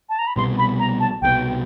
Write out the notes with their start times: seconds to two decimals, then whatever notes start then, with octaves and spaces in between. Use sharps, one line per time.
0.09 A5
0.19 A#5
0.27 B5
0.36 C2 B2 G3 B3 C6
0.58 B5
0.79 A#5
1.00 A5
1.22 C2 B2 G3 B3 G5